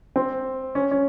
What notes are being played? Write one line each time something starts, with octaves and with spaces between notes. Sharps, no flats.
C4
C#4
C#4